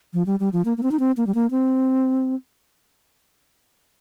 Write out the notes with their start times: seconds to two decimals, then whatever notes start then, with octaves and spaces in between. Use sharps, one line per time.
0.14 F3
0.26 G3
0.40 G3
0.53 F3
0.65 A#3
0.77 A#3
0.83 C4
0.91 D#4
0.99 C4
1.17 A#3
1.27 G3
1.35 A#3
1.51 C4